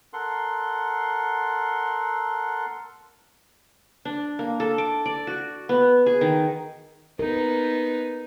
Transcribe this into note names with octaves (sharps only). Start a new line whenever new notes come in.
A4 A#4 F#5 C6
D4
A#3
A4
D6
D5
F#4
B3
G#4
D#3
B3 D#4 A#4